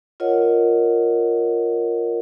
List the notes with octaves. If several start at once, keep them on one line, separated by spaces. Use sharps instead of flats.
F4 A#4 C#5 D#5 F#5